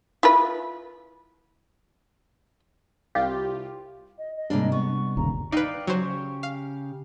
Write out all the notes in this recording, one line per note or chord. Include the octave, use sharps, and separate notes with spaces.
E4 F4 B4
C2 F4 G4
D#5
D#5
G#2 C3 G3 A#3 D4
B3 C#6
G1 D#2 C#3 A#5
D#4 B4 D5 F5 G5
C#3 F#3 G4 C5 C#6
F5